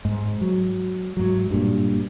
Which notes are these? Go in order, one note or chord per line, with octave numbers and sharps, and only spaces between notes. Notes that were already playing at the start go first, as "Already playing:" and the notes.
G#2
F#3
G#2 F#3
G2 A#2